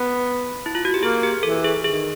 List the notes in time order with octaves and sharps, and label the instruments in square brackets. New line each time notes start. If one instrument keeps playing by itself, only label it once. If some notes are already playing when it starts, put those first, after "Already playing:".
Already playing: [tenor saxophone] B3
[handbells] E4
F4
F#4
G4
[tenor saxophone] A#3 [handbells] G#4
[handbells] G4
[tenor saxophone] E3 [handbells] A4
[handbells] G#4
[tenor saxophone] D#3 [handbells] G#4